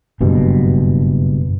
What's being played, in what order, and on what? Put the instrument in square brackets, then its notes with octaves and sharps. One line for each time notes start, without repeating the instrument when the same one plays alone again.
[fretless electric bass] F#1 G2 B2